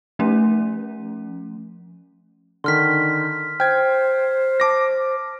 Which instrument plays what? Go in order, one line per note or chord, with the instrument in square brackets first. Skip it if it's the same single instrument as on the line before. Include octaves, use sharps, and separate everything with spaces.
[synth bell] F3 A3 C#4
[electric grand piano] D3 D#3 [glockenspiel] C6 F6 B6
[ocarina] C5 [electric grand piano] G5 G#6 [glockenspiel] F6
[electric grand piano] A5 D6 A#6